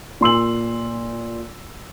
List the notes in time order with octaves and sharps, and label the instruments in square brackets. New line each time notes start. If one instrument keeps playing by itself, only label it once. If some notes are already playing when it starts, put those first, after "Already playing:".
[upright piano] A#2 C6 E6 F#7